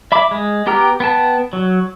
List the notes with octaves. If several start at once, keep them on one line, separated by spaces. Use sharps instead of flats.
E5 B5 D6
G#3
B3 G4 G5 A#5 F6
B3 G5 A5
F#3